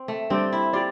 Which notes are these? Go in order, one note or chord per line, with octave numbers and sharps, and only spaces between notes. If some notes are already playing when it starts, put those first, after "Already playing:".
Already playing: C4
A3
G3 C4 D4 G4 D5 G5
E4
F4 G4 D5